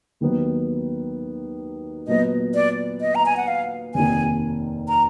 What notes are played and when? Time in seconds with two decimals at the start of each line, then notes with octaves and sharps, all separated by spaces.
0.20 D#2 D#3 F#3 B3 D#4
2.07 A#2 F#3 B3 D#5
2.55 D5
3.01 D#5
3.15 A#5
3.26 G#5
3.37 F#5
3.48 F5
3.95 F1 D#2 D#3 G#5
4.88 A#5